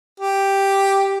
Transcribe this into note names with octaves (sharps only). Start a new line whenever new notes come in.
G4